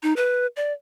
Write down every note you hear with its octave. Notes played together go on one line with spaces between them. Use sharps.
D#4
B4
D5